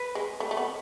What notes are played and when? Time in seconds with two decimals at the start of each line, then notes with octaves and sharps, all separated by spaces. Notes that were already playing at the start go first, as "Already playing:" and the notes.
Already playing: B4
0.15 G#3
0.40 A3
0.51 A3
0.57 B3